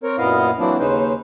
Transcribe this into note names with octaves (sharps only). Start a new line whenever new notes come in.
C4 A#4 C#5
F#2 A#2 B3 E4 D#5 F5
E3 F#3 A#3 C4 D4 E4
D#2 C#3 C#4 D#4 B4 C5